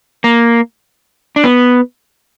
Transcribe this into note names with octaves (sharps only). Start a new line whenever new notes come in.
A#3
D4
B3